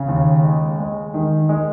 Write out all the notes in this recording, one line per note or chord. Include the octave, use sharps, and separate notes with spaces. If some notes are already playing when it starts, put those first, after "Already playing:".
Already playing: C#3
D#2
G#3
G#3
D#3
G#3